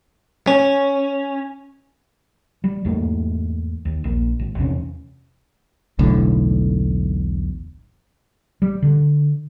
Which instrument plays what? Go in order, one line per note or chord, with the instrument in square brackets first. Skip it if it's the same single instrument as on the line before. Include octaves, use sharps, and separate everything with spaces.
[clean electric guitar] C#4
[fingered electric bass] G3
E2 G#2 A3 A#3
D#2
A#1 A#3
G#1
E2 C3 B3 C#4
[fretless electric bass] E1 B1 A2 D3
G3
D3